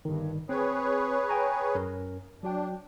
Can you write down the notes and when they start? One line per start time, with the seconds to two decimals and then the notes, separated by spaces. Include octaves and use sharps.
0.05 G1 G2 D#3
0.49 C4 G#4 B4 C#5
1.29 G5 G#5 A#5
1.75 F#2 C#4 A#4
2.43 F#3 D4 F#4 G5